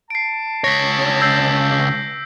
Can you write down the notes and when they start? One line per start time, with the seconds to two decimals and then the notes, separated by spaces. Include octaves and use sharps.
0.10 A5 C7 D7
0.64 C#2 C#5 A#6 B6
1.21 E6 G6 C7